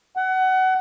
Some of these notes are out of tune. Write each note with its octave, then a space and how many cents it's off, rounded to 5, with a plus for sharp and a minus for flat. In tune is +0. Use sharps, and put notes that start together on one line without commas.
F#5 +25